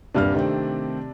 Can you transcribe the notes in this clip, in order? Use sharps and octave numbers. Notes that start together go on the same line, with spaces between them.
D#1 G2 C3 D4 F6
D#3 A3 C4